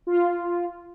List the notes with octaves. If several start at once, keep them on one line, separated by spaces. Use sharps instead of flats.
F4